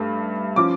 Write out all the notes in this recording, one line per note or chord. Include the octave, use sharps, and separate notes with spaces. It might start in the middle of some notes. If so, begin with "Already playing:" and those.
Already playing: G2 A3
F3 C#4 D6